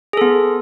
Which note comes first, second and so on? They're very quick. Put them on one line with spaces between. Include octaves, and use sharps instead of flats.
G#4 A4 B3